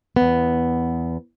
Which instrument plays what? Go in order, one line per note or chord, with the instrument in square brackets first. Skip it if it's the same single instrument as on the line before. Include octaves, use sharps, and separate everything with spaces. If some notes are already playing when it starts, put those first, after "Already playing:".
[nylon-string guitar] E2 B3